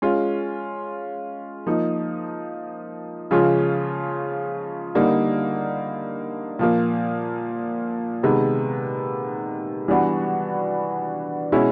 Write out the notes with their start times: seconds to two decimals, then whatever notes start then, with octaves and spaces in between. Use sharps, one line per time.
0.02 G#3 C#4 F4
1.67 F3 A#3 D#4
3.31 C#3 F3 G#3 C#4 F4
4.95 D3 G3 A#3 D#4
6.59 A#2 F3 A#3
8.23 C3 D#3 G#3 B3
9.88 E3 G3 B3 D4 F#4
11.52 B2 G#3 C#4 E4